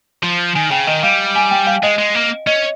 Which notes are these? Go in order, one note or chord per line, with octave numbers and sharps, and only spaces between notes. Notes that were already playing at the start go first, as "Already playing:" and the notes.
F3
D#3 G#5
C#3 G5
D#3 D#5
G3 F5
G#5
G5
F5
G#3 D#5
G#3
A#3
C#4 D#5